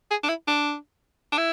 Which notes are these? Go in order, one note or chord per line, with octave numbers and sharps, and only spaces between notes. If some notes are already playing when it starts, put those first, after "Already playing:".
G#4
D4
E4
D4
D4
E4